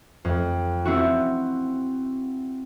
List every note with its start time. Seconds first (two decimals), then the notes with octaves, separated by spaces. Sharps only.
0.25 F2
0.85 C4 E4 F#4